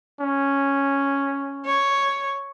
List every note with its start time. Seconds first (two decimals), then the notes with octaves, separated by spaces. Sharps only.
0.21 C#4
1.65 C#5